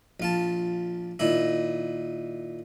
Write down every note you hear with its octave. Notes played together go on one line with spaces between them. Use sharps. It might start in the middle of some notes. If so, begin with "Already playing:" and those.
A#1 F4 A5
A#2 D#3 E4